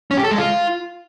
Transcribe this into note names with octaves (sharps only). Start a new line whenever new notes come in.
C#4
G4
A4
G#3
F4